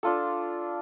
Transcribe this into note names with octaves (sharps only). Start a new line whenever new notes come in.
D4 F4 A4